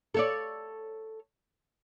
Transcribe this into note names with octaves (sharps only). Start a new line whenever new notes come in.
A4 C#5 D5